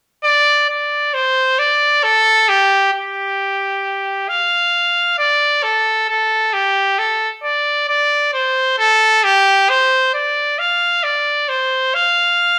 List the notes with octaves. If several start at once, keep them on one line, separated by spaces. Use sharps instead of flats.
D5
D5
C5
D5
A4
G4
G4
F5
D5
A4
A4
G4
A4
D5
D5
C5
A4
G4
C5
D5
F5
D5
C5
F5